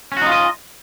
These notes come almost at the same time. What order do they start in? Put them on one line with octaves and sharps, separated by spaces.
C#4 F#4 D#4 F4 D#5